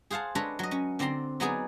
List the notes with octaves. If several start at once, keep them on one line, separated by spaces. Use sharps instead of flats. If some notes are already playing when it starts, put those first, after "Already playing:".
G#4 C5 F5 F#5 A5
G#3 D4 A4 B4 C#5 A#5
F#3 D#5
C#4
D3 C4 D5 A#5 C6
F#3 B3 D#4 G#4 D5